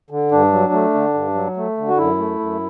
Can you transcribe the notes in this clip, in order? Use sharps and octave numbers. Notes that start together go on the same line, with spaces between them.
D3
G2 D4
F#3
A3
D3
G2
F#3
A3
D3
F#4
F#2 E4
A3
F#2